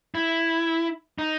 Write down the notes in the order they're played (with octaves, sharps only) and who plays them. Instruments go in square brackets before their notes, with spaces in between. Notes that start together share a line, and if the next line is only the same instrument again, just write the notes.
[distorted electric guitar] E4
D#4